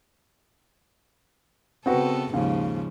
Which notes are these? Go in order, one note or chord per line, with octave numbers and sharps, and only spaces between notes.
C#3 B3 C4 F#4 A4 B4
D#2 G#2 C#3 F3